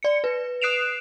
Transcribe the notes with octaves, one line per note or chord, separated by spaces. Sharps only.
D5 C#7
B4
D#6 F#6 C7 D7 E7 F7